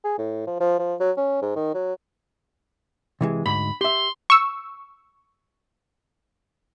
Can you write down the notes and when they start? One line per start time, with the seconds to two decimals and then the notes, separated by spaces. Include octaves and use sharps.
0.04 G#4
0.18 A2
0.47 F3
0.60 F3
0.79 F3
1.00 F#3
1.17 C#4
1.42 G#2
1.56 D#3
1.74 F#3
3.21 C3 E3 G#3
3.46 D2 G#2 B5
3.81 G4 E5 C6
4.30 C#6 E6